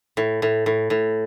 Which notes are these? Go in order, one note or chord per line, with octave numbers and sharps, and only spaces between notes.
A2
A2
A2
A2